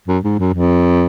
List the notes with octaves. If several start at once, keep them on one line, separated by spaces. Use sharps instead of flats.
F#2
G#2
F#2
F2